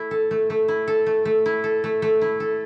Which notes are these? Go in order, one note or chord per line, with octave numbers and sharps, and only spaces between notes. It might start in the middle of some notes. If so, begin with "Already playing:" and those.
Already playing: A3 E4
A4
A3
A3
E4
A4
A3
A3
E4
A4
A3
A3
E4
A4